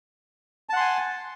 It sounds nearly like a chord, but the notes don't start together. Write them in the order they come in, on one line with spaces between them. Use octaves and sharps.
A5 F#5 C6 G#5